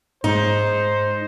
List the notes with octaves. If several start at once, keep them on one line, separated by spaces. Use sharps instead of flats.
G#2 G#3 D#4 C5